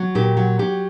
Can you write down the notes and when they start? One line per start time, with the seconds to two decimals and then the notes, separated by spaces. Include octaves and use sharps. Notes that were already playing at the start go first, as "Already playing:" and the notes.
Already playing: F#3
0.15 A#2 G4
0.37 F#3
0.59 F#3 G4